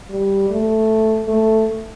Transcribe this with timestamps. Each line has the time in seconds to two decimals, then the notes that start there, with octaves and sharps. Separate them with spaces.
0.10 G3
0.50 A3
1.28 A3